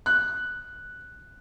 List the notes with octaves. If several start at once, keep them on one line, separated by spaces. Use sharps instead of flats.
F#6